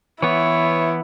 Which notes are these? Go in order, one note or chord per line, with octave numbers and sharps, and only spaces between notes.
E3 B3 E4 C#5